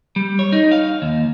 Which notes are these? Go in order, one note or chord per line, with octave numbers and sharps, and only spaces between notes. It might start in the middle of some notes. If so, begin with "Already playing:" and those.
G3
C#5
D#4
F5
D#2